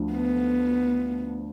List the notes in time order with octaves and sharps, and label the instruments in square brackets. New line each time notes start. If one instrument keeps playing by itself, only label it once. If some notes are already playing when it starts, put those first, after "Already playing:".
Already playing: [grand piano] D2 D3 F3
[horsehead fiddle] B3